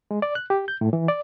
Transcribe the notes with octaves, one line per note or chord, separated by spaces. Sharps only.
G#3
D5
F#6
G4
G6
A2
E3
D5